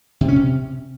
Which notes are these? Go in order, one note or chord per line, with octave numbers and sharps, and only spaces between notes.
C3
C#4
C3